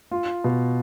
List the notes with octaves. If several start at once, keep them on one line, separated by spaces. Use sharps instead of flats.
F4
B2